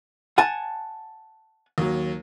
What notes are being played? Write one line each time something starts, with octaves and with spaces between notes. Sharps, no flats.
F#5 G#5 A5
D#2 F#3